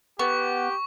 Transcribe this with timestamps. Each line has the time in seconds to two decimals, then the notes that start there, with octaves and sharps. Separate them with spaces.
0.19 B3 G4 C#6